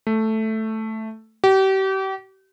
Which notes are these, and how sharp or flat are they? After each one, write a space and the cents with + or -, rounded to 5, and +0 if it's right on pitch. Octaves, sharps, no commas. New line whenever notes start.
A3 +0
G4 -35